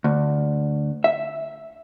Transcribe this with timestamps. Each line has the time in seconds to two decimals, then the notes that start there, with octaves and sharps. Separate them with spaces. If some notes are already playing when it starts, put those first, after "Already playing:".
0.04 D2
1.04 E5